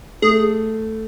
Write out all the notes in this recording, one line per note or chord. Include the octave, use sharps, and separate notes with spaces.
A3 G#4